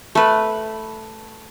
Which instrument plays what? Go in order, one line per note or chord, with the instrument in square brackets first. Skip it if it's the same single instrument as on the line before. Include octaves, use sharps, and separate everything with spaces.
[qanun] A3 B4